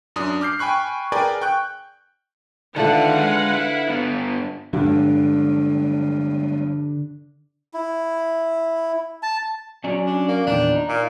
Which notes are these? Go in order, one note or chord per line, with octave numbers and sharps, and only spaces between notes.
F#2 D4 D#6
D6 F6 G6 C7
G5 G#5 B5 C#6 F#6
G#4 A#4 B4 D5 G5 G#5
G5 C#6 F#6 G6
D3 D#3 F3 A3 B4 F5 F#5 A5
G#3
E4
G2 B3
G2 D3 F3 G3 G#3
E4
A5
F#3 C#4 D5
D4
A#3
E2 A#2 D#3 D4
D#4
A#2